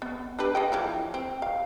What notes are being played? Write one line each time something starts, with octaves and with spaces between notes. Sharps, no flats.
B3
D4 G4 B4
G#4 D#5 G5
E3 F3 E4
C4
F5